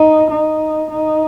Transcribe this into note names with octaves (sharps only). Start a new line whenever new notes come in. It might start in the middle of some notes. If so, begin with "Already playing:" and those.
Already playing: D#4
D#4
D#4